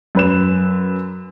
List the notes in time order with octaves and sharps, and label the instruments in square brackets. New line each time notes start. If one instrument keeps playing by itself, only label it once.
[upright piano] F#2 B4 E7